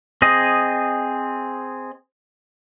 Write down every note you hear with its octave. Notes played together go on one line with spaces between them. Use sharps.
C4 G#4 D#5